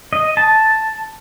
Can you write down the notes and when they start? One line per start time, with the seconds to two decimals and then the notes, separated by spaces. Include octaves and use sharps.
0.13 D#5
0.37 A5